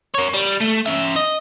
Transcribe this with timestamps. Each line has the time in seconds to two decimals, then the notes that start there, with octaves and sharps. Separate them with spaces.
0.14 A#4 C#5
0.33 G3
0.60 A3
0.86 C#4 E5
1.16 D#5